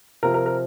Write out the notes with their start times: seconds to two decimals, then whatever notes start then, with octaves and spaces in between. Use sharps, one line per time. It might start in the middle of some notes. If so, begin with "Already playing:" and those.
0.23 C3 F3 C4 F4 A#4
0.34 A#4
0.46 A#4